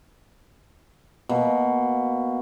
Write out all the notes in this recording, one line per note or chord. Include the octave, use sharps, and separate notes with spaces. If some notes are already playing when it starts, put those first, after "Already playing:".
B2 A#3